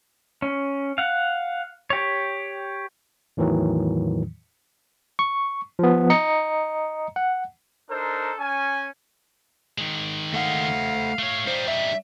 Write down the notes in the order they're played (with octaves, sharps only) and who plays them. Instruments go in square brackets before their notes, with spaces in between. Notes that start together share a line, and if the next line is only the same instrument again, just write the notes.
[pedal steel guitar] C#4
F5 F#5
G4 C#5
[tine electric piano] E2 A2 D#3 E3 F#3
C#6
F3 B3
D#5 A#5 C#7
F#5
[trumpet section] D4 D#4 A4 A#4 C5
C#4 G#5
[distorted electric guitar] D#3 G#3
[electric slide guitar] A3 F#5 [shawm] F5
[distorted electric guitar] A3 C#5
[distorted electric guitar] G3 D#4 [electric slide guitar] C5
[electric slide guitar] E5